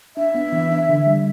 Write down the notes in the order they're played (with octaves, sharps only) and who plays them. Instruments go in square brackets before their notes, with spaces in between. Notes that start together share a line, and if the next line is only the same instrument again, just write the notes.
[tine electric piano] D4 [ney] E5
[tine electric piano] B3
E3
D4
D3
G3